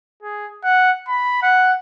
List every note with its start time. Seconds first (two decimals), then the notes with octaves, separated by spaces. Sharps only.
0.23 G#4
0.64 F#5
1.07 B5
1.42 F#5